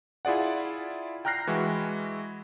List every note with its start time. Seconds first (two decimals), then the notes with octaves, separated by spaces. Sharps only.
0.25 E4 F4 G#4 D5 F#5
1.25 G5 A#5 F6 F#6 A#6 C7
1.47 E3 G#3 E4 F#4